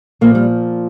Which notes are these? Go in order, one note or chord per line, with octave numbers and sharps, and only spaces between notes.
A#2 F3 A#3
G3